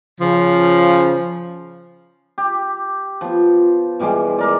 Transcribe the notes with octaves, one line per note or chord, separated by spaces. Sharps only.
C#3 F3
G4
F3 B3
B2 E3 G3 G#3
G#3 A#4 D5